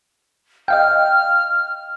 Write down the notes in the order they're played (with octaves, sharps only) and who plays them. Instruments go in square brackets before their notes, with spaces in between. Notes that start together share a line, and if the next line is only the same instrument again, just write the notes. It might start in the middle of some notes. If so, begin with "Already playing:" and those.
[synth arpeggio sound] D#5 F5 G5 [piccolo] F6